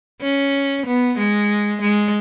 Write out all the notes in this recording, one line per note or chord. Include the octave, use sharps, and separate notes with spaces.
C#4
B3
G#3
G#3